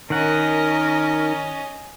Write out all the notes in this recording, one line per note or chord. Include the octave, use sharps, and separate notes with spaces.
D#3 C#4 A#4 D#5 F#5